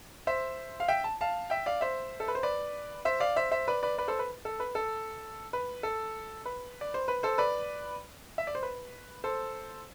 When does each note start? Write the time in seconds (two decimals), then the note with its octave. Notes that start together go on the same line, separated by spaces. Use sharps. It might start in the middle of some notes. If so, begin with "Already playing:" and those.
0.27 C5 E5
0.80 F5
0.88 E5 G5
1.04 A5
1.21 F5 A5
1.50 E5 G5
1.66 D5 F5
1.81 C5 E5
2.20 A4
2.28 B4
2.35 C5
2.43 B4 D5
3.05 C5 E5
3.20 D5 F5
3.36 C5 E5
3.51 C5 E5
3.68 B4 D5
3.83 B4 D5
3.98 B4 D5
4.08 A4 C5
4.19 B4
4.45 A4
4.60 B4
4.75 A4
5.53 B4
5.83 A4
6.45 B4
6.81 D5
6.94 C5
7.08 B4
7.23 A4 C5
7.38 B4 D5
8.38 E5
8.47 D5
8.55 C5
8.63 B4
9.24 A4 C5